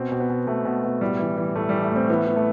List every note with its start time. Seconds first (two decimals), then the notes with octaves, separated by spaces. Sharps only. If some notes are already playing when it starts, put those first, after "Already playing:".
Already playing: B2 C4
0.12 B2
0.20 B3
0.30 B2
0.47 B2 A3
0.65 B2
0.84 B2
1.01 A2 G3
1.19 E3
1.37 E3
1.56 A2 A3
1.69 E3 G3
1.82 A3
1.92 A2 C4
2.10 E3 B3
2.27 E3
2.36 A3